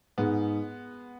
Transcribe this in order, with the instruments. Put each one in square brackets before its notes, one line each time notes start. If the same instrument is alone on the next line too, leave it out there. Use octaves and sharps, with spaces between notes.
[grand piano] G#2 [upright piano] G#3 B3